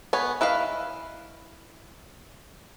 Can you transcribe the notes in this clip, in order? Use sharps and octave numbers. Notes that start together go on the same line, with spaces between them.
B3 C#5 G#5
E4 B4 D#5 F5